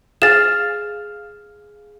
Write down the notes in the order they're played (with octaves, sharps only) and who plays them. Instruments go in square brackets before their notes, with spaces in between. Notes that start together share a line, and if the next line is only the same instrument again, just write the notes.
[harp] G#4 F5 [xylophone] A6 E7